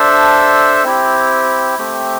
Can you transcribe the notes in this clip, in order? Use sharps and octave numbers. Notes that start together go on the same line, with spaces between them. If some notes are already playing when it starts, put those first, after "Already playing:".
Already playing: D4 A4 C5 E5
C4 E4 G4
A3 C4 G4